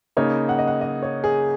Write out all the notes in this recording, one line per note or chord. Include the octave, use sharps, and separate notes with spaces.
C#3 A#3 D#4 C#5
F#5
D#5
F#5
D#5
C#5
G#4